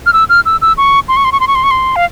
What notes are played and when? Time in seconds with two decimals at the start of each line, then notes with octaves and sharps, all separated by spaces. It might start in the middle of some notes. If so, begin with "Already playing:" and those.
0.06 F6
0.13 E6
0.29 F6
0.45 E6
0.62 E6
0.77 C#6
1.08 C6
1.17 C#6
1.25 C6
1.32 C#6
1.40 C6
1.48 C#6
1.55 C6
1.64 C#6
1.71 C6
1.96 F5